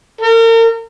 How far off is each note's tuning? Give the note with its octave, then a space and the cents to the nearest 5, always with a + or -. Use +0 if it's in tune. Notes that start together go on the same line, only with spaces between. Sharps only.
A#4 -40